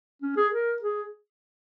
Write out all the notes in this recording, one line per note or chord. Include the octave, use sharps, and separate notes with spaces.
C#4
G#4
A#4
G#4